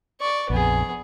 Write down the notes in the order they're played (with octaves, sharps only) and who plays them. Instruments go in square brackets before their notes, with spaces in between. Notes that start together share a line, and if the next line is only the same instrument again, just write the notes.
[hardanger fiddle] D5 C#6
[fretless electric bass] A#1 F2 [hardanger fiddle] B3 G#4